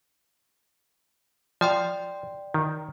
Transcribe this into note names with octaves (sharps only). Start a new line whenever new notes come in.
F3 D5 G5 C6
D#3